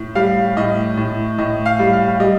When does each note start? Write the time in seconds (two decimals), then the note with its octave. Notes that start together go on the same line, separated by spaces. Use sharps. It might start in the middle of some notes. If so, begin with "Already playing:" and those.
Already playing: A2
0.15 G3 F5
0.57 A2 D#5
0.97 A2
1.39 A2 D#5
1.66 F5
1.79 G3
1.93 F5
2.20 G3 D#5